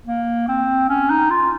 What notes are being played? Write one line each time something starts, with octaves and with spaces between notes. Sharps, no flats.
A#3
C4
C#4
D#4
F4